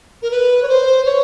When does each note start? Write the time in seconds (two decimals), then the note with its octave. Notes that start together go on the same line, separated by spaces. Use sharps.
0.22 A#4
0.31 B4
0.63 C#5
0.69 C5
1.05 C#5